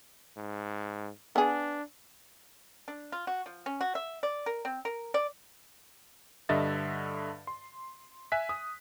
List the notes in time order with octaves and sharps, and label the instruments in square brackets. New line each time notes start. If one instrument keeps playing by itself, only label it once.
[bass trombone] G#2
[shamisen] B3 G#4 [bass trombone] D4
[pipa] D4
F4
F#4
F3
C#4
F#4
E5
D5
A#4
C4
A#4
D5
[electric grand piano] G2 D3 D#5 E5 A6
C6
E5 G#5 F#6 B6
D#6